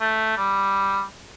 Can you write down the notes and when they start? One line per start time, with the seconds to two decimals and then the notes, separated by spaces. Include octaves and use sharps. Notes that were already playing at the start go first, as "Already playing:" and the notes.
0.01 A3
0.37 G3